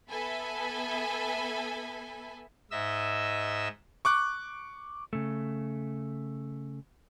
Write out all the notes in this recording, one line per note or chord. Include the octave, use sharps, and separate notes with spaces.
B3 A4 E5 G#5 B5
G#2 D#5 E5 E6
C#6 D6 F#6
C#3 A3